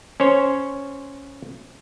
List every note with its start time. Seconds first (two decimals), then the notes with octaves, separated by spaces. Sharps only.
0.20 C#4 C5 C#5